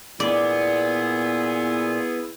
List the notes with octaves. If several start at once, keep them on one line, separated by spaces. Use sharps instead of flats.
A#2 B3 E4 G#4 D5